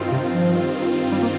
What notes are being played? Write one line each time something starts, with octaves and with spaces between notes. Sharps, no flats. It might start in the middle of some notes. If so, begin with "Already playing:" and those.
Already playing: G2 D#3 C4 F4
C3
F3
G3
A#3